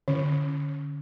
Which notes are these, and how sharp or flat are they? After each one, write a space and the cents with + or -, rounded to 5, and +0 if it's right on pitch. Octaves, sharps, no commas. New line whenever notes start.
D3 +0 C#4 +0